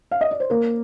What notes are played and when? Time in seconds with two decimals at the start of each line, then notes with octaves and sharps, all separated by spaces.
0.11 F5
0.21 D#5
0.31 D5
0.40 C5
0.50 A#3 A#4